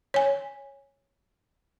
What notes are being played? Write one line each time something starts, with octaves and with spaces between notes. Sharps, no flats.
C#5 G#5